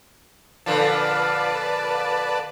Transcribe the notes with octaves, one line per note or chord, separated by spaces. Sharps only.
A#2 D3 F3 B4 D5 A5